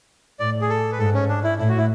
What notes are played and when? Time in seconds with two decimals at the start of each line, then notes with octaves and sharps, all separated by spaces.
0.40 A2 D5
0.61 G#4
0.70 A4
0.92 B4
0.99 G#2 A4
1.14 C#4
1.29 D4
1.44 E4
1.59 A2 E4
1.69 F#4
1.78 E4